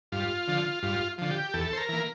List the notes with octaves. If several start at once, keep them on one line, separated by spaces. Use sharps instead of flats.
G2 F4
D3 F3
G2 F4
D3 F3
G4
E2 A4
C5
A#4
E3 A#3